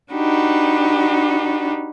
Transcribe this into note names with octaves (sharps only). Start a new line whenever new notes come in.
D4 D#4 F#4 G4 B4